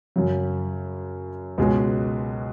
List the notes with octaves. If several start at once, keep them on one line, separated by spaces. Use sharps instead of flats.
F#2 C#3 F#3
C#2 B2 G#3 C#4